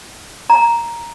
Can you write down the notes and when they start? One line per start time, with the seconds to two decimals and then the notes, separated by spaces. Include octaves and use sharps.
0.50 A#5